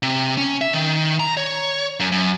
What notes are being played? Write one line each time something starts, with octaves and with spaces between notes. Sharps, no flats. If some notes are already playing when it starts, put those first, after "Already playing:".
C3
C#4
E5
D#3
A#5
C#5
F#2
F#2